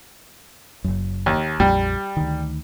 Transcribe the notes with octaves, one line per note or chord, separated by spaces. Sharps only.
F#1 F#2
D#2
A#1 F2 G3
D2 D#3